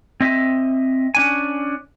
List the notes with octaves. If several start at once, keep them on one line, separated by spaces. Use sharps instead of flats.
C4 D#5 E5
C#4 D4 G#5